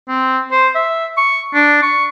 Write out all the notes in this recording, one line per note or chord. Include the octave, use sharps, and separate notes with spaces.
C4
C5
E5
C#6
D4
C#6